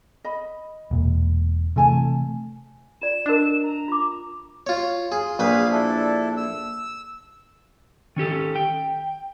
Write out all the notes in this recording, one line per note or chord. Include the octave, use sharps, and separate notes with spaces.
D#5 B5
E1 A#2
C3 E3 A3 A4 G#5 A5
F4 D5 E7
D4 A#4 D#5
A#5
F4 D6
F4 C#5
F4 G#4
A#1 G#4 B4 F5 B5
D4 E4 A4
E6
D#3 C#4 G4 A4
G5